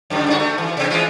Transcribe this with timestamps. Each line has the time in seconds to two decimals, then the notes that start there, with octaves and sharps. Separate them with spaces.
0.10 F#2 A2 D3
0.26 G2 D3 F#4
0.40 A3
0.58 E3
0.77 C3 C4
0.90 E3 G#3 F4